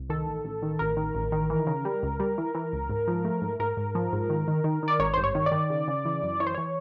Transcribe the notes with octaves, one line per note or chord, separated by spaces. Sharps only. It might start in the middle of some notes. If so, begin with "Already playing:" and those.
Already playing: C2
D#3 A4
A1
A1
D#3
A1 A#4
D#3
A1
D#3
E3
C#3
G3
C#2
G3
E3
E3
C#2
G#2
F3
A3
G#2
G#2 A#4
G#2
F3
G#2
D#3
D#3
D#3
D#3 D5
G#1 C#5
G2 C5
C#5
D#3
D5
D#3
C#3
C#3
E3
F#2
E3 C#5
C5
E3 C#5